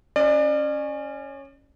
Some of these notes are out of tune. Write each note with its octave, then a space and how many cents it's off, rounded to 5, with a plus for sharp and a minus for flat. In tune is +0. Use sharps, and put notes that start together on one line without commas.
C#4 -5 D5 +35